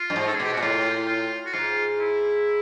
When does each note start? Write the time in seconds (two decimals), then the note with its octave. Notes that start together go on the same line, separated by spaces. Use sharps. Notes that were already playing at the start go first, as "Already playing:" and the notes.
Already playing: F4
0.10 G2
0.16 G#2
0.27 A4
0.35 G#4
0.40 B2 G4
0.53 F#4
0.57 A#2
0.61 A2 F4
1.08 F4
1.46 F#4
1.53 G#2 F4
1.98 E4